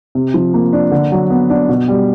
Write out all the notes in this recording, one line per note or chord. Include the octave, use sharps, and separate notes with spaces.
C3
F3
A#3
D4
D3
F#3
B3
D4
B2
G3